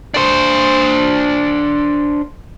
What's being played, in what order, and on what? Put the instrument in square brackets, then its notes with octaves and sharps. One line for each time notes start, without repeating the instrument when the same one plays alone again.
[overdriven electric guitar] D4 C5